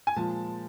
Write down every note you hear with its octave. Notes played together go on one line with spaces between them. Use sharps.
G#5
A#2 F3 G#3 A5